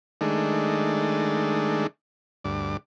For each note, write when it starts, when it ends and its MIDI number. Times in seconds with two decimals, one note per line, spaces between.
0.21 1.87 51
0.21 1.87 56
0.21 1.87 57
0.21 1.87 62
2.44 2.77 38
2.44 2.77 43
2.44 2.77 74